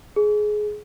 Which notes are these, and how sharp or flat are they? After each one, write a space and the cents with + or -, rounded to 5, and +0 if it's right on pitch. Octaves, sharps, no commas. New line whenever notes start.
G#4 +20